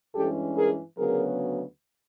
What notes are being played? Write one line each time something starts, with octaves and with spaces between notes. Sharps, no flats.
G2 E3 G#3 C#4 G4 A4
G#4 A#4
D2 C#3 F#3 B3 G#4 A#4